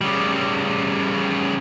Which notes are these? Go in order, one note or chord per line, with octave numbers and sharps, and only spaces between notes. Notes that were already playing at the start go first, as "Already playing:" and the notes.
C#3 G3